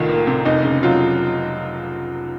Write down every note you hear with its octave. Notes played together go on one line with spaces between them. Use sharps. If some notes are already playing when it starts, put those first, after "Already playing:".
Already playing: C2 A2 D#3 F4
A#3
C3
F1 D#4
C#3
F#3 F4